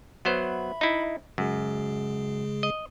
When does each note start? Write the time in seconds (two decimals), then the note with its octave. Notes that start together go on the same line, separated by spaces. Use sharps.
0.25 F#3 B3 C5 E5 B5
0.81 D#4 E4
1.38 F#2 C#3 G#3 G#4
2.63 D#5